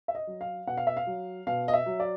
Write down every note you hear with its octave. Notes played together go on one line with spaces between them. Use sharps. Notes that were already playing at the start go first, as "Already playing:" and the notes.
E5
D#5
F#3
F5
B2 F#5
F5
E5
F5
F#3
B2 F5
D#5
E5
F#3
D5